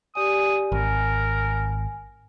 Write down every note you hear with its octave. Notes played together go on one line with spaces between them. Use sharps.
G4 D5 G#5 D#6
G#1 A#4 G#5